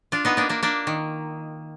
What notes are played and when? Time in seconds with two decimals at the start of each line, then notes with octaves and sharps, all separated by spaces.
0.12 D4 F4
0.25 B3 D#4
0.37 A#3 D4
0.49 A#3 D4
0.63 A#3 D4
0.87 D#3